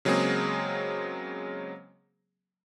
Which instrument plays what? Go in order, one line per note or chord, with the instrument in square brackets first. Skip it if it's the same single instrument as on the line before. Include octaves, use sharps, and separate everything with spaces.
[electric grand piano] C#3 F#3 G#3 A#3 C4 G#4